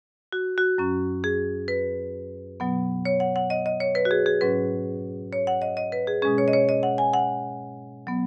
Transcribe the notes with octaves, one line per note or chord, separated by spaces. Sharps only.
F#4
F#4
F#2 F#3 C#4
G#4
B4
B2 F#3 B3
C#5
F#5
F#5
D#5
D#5
C#5
B4
F#4
G#4
G#4
G#2 F#3 C#4 B4
C#5
F#5
D#5
D#5
B4
G#4
B2 G#3 C#4 G#4
C#5
D#5
C#5
D#5
F#5
G#5
F#5
F#3 B3